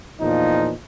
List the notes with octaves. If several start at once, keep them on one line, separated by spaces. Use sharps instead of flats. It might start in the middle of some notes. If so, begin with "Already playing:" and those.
E2 A#2 F3 D#4